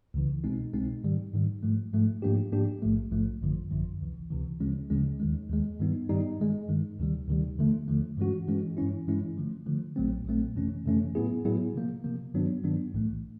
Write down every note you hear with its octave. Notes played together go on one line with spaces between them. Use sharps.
C#2 C#3 E3
C2 B2 G#3 C4 D#4
C2 B2 G#3 C4 D#4
G#2 D#3 G3
G#2 D#3 G3
G#2 F3 A3
G#2 F3 A3
G#2 F3 A#3 D4 G4
G#2 F3 A#3 D4 G4
A#1 G#2 F3 A3
A#1 G#2 F3 A3
G#1 F#2 D3 F3
G#1 F#2 D3 F3
C#2 C3 E3
C#2 C3 E3
D2 C#3 F3 G#3 C#4
D2 C#3 F3 G#3 C#4
D#2 D#3 G#3
D#2 D#3 G#3
G2 D#3 G3 B3 D#4
G2 D#3 G3 B3 D#4
G2 D#3 G#3
G2 D#3 G#3
D2 C3 D#3 G3
D2 C3 D#3 G3
D#2 D3 F3 A3
D#2 D3 F3 A3
G2 E3 G#3 C#4 F#4
G2 E3 G#3 C#4 F#4
G2 E3 G#3 C#4 E4
G2 E3 G#3 C#4 E4
D3 F3 A3
D3 F3 A3
A#1 A#2 F#3 A3 C4
A#1 A#2 F#3 A3 C4
F2 C3 E3 A3 C#4
F2 C3 E3 A3 C#4
A2 F#3 B3 E4 G#4
A2 F#3 B3 E4 G#4
C3 F3 A#3
C3 F3 A#3
G2 D#3 F#3 B3 D4
G2 D#3 F#3 B3 D4
B1 A2 E3 A3